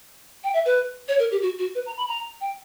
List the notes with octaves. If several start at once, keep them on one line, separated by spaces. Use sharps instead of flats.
G5
E5
B4
C#5
A#4
G4
F#4
F#4
B4
A#5
B5
A#5
G5